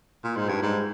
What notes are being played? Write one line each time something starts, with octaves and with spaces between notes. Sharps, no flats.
A#2
G#2
G2
G#2